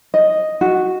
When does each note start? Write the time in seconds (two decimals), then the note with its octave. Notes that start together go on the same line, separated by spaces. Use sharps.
0.14 D#5
0.61 F#4